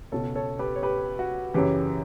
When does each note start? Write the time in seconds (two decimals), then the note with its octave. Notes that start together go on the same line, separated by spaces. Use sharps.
0.12 C#2 B2 A4 C#5
0.35 A4 C#5
0.59 G4 B4
0.76 C#5
0.83 G4 B4
1.19 F#4
1.54 F#2 C#3 E3 G4